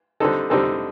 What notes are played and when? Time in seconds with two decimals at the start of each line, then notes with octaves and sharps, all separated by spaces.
0.20 D3 G3 C4 D#4 A4
0.50 D3 G3 C4 D#4 A4